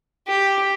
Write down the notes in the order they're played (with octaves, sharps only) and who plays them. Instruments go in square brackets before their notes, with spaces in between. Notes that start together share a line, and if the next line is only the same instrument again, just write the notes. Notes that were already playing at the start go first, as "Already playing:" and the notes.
[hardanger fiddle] G4